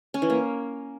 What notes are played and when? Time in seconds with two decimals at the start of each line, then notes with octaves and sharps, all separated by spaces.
0.14 C#4
0.22 E3
0.30 A#3